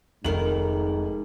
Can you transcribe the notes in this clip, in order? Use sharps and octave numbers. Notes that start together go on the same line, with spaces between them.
F1 G#2 D#3 A#4 F#7